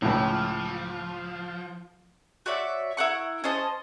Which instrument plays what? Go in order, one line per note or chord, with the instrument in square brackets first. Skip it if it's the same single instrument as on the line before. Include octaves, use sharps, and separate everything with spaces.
[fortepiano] C#2 A2 [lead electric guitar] F3
[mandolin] F#4 C#5 D5 E5
E4 A#4 F#5 C#6
C#4 C5 D#5 A5